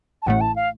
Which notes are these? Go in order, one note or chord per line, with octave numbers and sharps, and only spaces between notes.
A5
A1 A2 A3 F#5
A5
F5